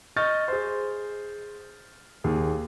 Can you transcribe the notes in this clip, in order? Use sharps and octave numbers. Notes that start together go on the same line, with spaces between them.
D#5 C#6 F6 G6 A6
G#4 C5
D#2 G#4